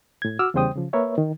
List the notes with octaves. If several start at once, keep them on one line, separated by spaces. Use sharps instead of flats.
A2 G#6
F#4 D6 E6 F6
E2 C#3 G3 C5 G5 D#6
C#3 F3
A#3 A#4 B4 C#5 E5
D#3